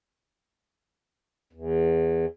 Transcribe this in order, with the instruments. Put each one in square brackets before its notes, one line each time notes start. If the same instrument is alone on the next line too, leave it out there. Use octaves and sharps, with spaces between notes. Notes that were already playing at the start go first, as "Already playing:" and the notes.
[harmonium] E2